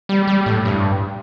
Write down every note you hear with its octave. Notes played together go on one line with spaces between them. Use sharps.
G3
G3
A2
G2